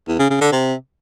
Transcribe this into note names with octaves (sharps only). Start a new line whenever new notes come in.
E2
C#3
C#3
D3
C3